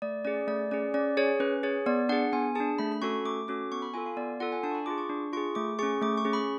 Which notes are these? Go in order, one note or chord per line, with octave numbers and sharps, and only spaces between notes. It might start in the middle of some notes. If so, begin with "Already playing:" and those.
A3 D5
C#4 G#4 D5
A3 D5
C#4 G#4 D5
C#4 D5
G#4 C#5
C#4 B4
G#4 C#5
B3 D5
D4 G#4 F#5
B3 G#5
D4 G#4 A5
A3 B5
B5
C#4 F#4 A4 C#6
A3 D6
C#4 F#4 A4 D6
B3 C#6
B5
F4 A4 G#5
F5
B3 D5
F4 A4 F#5
G#5
D4 A5
C#6
B5
F4 G#4 D6
C#6
D4
F4 G#4 C#6
A3 D6
C#4 G#4 C#6
A3 D6
C#6
C#4 G#4
B5